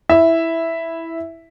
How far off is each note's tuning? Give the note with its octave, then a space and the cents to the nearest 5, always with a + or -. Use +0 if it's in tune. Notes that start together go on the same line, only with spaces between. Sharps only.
E4 -5 E5 +0